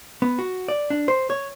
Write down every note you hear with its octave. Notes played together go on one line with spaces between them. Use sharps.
B3
F#4
D5
D4
C5
C#5